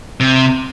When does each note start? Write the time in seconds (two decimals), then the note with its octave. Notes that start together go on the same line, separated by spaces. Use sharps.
0.20 C3